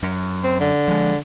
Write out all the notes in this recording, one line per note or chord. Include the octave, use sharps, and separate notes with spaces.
F#2
C4
D3
F3 G#3